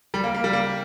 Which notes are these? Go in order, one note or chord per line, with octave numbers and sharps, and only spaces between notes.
G3
A#3
A#3
G3
A#3